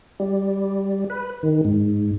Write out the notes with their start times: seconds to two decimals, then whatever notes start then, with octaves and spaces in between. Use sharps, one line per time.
0.20 G3
1.10 B4
1.43 D#3
1.65 G#2